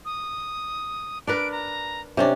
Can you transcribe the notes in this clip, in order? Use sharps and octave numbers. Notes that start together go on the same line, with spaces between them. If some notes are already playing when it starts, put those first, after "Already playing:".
D#6
D4 A#4 B4 D7
A#5
C3 C#4 D4